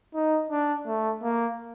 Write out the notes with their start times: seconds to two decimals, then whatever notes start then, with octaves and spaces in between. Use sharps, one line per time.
0.15 D#4
0.51 D4
0.87 A3
1.23 A#3